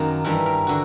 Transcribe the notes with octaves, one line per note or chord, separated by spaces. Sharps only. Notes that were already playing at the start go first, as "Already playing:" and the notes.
Already playing: F#2 D#3 F#3 A#3
G2 E3 G3 A#4
A#4
D3 F#4